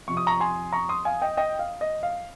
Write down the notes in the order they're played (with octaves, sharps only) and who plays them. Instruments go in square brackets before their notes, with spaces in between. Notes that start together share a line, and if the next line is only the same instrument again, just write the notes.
[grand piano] F2 C3 F3 C#6
D#6
A#5 C#6
G#5 C6
A#5 C#6
C6 D#6
F5 G#5
D#5 G5
D#5 G5
F5
D#5
F5